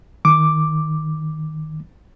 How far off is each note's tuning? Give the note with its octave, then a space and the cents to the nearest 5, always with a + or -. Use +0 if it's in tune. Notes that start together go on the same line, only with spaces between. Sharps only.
D#3 +0 D6 +0